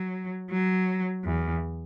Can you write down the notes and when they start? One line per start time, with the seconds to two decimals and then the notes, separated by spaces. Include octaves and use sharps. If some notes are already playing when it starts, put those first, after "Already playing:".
Already playing: F#3
0.51 F#3
1.25 E2